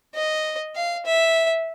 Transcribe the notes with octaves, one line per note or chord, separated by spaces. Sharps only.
D#5
F5
E5